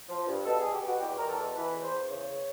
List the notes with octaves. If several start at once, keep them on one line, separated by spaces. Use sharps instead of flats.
F3
G2
B2 A4
B2 G#4
G4
B2 F#4
E2 G4
E2 A#4
A4
B2
E3 B4
E2
C5
E2
C#3 C#5